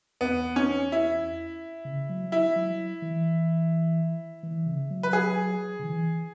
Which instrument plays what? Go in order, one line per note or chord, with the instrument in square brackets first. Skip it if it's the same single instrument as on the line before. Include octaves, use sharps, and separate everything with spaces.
[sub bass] E2 [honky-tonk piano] B3
[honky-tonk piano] C#4
E4
[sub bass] C#3
F#3
[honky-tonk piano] E4
[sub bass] F#3
E3
E3
C#3
F#3
[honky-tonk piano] B4
G#4
[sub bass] C#3
E3